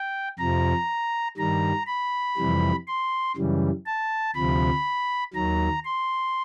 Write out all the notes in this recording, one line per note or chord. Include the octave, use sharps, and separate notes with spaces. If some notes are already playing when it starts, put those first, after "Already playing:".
Already playing: G5
F2 C3 F3 A#5
G2 D#3 G3 A#5
B5
F2 C3 E3 G3
C6
F#2 C#3 E3 G3
A5
D2 C3 F3 B5
D#2 D#3 F#3 A#5
C6